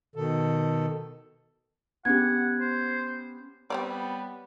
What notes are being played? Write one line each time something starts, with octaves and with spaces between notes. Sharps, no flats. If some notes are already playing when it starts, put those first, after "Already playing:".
B2 D#3 A4
B3 C#4 G4 F#5 G#6
C5
G3 B3 C4 C#5 D5